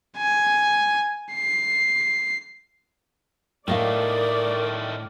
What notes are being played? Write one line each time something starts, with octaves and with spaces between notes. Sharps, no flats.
G#5
C7
A2 D#3 A3 A#4 D5 D#5 F5